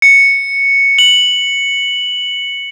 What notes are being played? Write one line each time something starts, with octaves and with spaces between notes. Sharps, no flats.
C#7
F#7